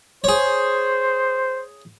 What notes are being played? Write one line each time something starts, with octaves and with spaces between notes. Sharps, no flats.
G#4 C5 C#5